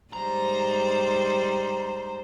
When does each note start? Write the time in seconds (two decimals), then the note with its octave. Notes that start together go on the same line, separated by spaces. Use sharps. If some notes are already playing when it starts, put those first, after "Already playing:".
0.13 G#2 G3 C5 A#5